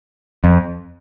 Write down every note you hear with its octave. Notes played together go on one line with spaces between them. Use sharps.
F2